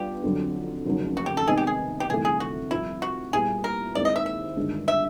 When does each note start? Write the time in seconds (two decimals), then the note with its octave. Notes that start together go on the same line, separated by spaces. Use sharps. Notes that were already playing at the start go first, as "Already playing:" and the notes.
Already playing: G3 B3 D4 F4 G4
0.24 F2 D3 F#3
0.85 F1 D#2 C#3 F#3
1.17 F#4
1.26 G4
1.37 A4
1.47 C3 D#3 G#3 B3 D#4 G#4
1.57 G4
1.67 G#4
2.00 G4
2.09 G1 F2 C3 E3 A3 G#4
2.25 G#4
2.40 F#4
2.71 C2 C3 F3 E4
3.02 F#4
3.33 A#2 G3 B3 E4 G4 G#4
3.64 A#4
3.95 D#2 D#3 G#3 C4 E4 D5
4.05 D#5
4.16 E5
4.26 E5
4.57 G1 G2 D#3 G#3
4.88 E5